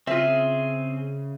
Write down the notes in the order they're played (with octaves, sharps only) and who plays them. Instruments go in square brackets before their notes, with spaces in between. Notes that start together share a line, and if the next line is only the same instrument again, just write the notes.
[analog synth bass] C#3 [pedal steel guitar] C4 G#4 [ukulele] F4 E5